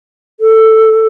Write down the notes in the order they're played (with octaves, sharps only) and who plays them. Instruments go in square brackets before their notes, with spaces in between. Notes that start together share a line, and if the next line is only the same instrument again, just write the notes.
[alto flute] A4